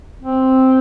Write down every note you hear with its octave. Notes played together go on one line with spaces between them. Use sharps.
C4